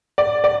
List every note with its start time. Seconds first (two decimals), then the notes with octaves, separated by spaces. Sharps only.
0.18 D5
0.44 D5